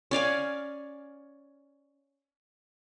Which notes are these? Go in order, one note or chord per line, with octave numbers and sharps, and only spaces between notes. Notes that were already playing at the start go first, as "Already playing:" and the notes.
C#4 D5 F5 G#5